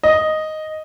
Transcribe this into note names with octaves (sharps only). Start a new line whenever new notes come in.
D#5